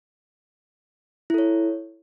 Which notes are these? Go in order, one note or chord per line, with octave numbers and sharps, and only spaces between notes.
E4 A4 C#5